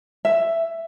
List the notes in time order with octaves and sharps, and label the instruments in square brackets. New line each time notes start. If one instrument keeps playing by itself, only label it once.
[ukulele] E5